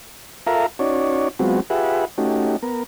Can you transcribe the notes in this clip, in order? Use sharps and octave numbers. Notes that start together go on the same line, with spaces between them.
F4 A4 A#4 E5 F5 A#5
C#4 D#4 F#4 C#5 D5
F#3 G#3 B3 C4 F4 F#4
F4 G4 G#4 B4 E5 F#5
A3 C#4 D#4 F#4 G4
B3 A#4